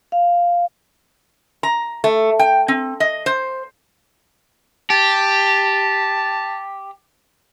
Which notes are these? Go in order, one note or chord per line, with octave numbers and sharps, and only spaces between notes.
F5
A#5
A3
G5
C4
D#5
C5
G4 A5